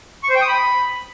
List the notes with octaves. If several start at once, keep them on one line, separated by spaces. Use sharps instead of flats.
C#6
C5
G5
D#6
B5